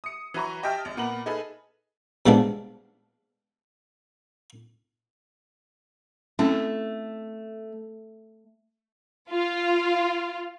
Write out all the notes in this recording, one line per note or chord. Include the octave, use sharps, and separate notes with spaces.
D#6 C#7
E3 F#3 B4 A#5 C#6
G4 D#5 E5 G5 A5 F6
G#1
A#2 B3 A#4 B5 F#7
D#4 G#4 A4 B4
B2 F3 G3 G#3 B3 D4
A3 C4 C#4 E4
F4